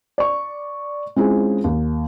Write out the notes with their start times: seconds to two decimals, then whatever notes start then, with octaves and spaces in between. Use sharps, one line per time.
0.18 D5 C#6
1.16 G#3 C4 C#4 E4 F4 G#4
1.64 D#2